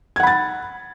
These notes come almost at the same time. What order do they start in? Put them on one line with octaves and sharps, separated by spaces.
G#6 F#5 B5 A6